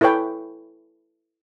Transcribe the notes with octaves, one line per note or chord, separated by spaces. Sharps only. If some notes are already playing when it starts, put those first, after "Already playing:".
E4 A4 B4 C#5 G5